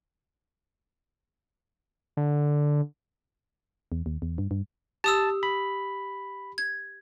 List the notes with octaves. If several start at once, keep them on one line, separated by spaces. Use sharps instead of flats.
D3
E2
D#2
E2
G2
G2
G4 A5 D#6 E6
B5
G#6